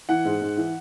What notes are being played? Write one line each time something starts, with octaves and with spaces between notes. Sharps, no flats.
E3 F#5
G#2
G#2
E3